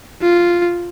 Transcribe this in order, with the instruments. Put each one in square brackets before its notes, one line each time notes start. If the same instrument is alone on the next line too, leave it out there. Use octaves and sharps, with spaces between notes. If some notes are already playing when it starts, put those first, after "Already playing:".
[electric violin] F4